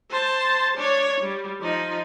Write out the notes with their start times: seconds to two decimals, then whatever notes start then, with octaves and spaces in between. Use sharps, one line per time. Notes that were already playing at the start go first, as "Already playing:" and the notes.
0.11 C5 A5
0.78 D4 C#5
1.21 G3
1.61 F3 D#4